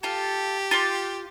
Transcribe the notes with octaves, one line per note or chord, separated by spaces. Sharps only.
F4 G4 A4
F4 C6 D6